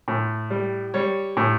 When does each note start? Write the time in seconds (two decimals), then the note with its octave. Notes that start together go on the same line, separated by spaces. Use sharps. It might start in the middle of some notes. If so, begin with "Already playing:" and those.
0.08 A2
0.50 G3
0.94 G3 C#5
1.37 A2